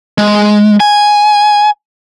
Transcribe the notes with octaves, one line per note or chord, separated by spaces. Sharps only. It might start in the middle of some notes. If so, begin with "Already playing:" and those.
G#3
G#5